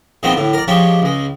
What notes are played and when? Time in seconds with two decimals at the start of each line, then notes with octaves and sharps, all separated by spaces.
0.23 A#2 D#3 F3 G#3 B3 C4
0.36 A2 D3
0.53 A#4 D5
0.68 F3 G#3 D4 G4 C#5
1.02 C#2 G#3